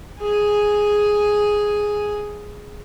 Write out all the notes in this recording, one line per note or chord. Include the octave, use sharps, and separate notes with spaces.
G#4 G#5